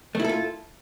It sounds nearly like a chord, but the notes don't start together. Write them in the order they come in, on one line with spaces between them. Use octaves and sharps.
A3 E4 A4 F4